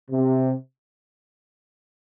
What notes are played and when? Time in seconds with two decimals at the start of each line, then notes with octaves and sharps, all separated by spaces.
0.11 C3